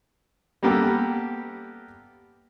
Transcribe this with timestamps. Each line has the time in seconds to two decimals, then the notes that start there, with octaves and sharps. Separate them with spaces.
0.63 G3 A#3 B3 G4 A4